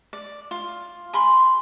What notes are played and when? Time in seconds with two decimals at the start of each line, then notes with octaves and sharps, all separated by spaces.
0.13 D5
0.51 F4
1.13 G#5 B5 C6